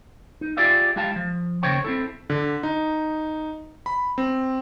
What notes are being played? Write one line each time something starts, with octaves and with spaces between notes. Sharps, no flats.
D#4
F4 G4 G#4 D5 E5 F5
G#3 E4 G4 F5 A5
F3
D#2 C#3 C5 C#5 G5
C4 E4 A4
D3
D#4
B5
C4